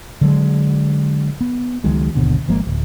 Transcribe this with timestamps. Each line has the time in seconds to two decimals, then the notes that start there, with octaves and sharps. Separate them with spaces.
0.21 D3 F#3 G#3
1.41 B3
1.84 C#2 D#3 F#3 G#3
2.15 G1 D#2 B2 D3
2.48 G#1 F3 G#3 A#3
2.67 D1